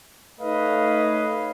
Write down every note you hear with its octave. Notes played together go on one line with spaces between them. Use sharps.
A3 D#4 B4 C#5 D#5 F5